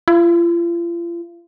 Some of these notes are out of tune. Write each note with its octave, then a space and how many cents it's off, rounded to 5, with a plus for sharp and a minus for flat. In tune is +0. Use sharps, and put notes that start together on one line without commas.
F4 -40